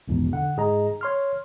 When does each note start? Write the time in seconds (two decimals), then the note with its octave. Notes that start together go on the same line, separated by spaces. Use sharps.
0.08 A#1 E2 G#2 B2
0.32 D3 F#5
0.57 G#2 G#4 D#5 A#5
1.01 C#5 C6 F6